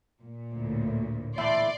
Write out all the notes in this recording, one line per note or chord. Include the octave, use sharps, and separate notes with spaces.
A#2
D2 A2
E2 A2 D5 E5 C6